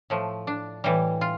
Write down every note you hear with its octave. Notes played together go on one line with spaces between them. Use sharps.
A2 F3 A3
D4
A2 E3 G3
F4